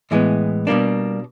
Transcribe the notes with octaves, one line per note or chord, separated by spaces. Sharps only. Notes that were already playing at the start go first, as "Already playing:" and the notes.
A2 E3 G#3 B3
B2 G3 A#3 D4